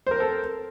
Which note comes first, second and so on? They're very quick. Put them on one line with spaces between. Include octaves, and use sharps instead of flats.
C5 A#4 C4 A4